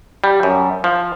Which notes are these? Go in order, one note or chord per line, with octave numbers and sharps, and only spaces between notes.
G3
F#2
F3